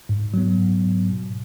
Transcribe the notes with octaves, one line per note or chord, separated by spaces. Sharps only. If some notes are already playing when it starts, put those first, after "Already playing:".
G#2
F#3 B3
G#2
F#3 B3
B2